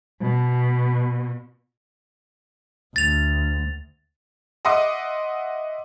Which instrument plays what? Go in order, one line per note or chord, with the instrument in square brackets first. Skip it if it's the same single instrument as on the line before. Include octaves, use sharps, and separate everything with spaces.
[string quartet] B2
[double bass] D2 [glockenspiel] A6 F7
[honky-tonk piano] D#5 E5 F#5 C6 D6 D#6